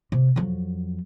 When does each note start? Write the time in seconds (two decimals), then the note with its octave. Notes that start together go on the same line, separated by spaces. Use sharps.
0.12 C3
0.36 F2 F#3